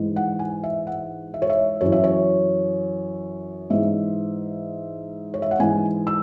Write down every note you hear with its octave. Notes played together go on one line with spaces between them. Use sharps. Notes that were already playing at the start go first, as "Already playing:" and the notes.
Already playing: G#2 E3
F#5
G#5
E5
F#5
E5
C#5
E5
F#2 E3 C#5
E5
C#5
G#2 E3 E5
C#5
E5
F#5
G#2 E3 G#5
E6